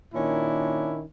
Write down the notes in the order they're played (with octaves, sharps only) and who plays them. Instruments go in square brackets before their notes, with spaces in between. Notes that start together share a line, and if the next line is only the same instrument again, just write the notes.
[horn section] A#2 D#3 C#4 D4 E4